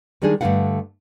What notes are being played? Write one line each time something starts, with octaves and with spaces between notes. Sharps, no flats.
D#3 G3 G#3 D4 D#4 G#4
G2 D3 A3 D#4 F5 F#5